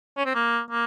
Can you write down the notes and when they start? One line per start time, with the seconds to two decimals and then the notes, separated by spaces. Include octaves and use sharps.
0.17 C#4
0.26 C4
0.35 A#3
0.70 A#3